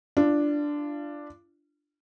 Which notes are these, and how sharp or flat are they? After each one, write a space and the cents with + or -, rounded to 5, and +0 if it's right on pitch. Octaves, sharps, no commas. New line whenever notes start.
D4 +0 F4 -30